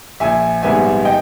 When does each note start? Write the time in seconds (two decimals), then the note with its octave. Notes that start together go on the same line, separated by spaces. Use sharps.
0.20 A#1 E5 G#5
0.62 G#2 G3 B3 E5 G#5
1.05 D#5 G5